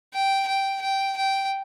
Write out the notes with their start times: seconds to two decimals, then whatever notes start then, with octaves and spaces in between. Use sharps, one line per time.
0.13 G5
0.47 G5
0.82 G5
1.17 G5